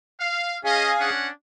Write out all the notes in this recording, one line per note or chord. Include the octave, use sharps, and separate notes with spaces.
F5
C#4 G#4 D#5 F5 G#5
C#4 D4 F#5